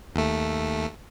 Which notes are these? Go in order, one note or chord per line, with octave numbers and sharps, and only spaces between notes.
D#2 A3